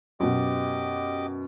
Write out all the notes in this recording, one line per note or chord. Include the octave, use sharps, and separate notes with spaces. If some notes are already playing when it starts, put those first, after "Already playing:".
F#2 B2 G4 D#5 D6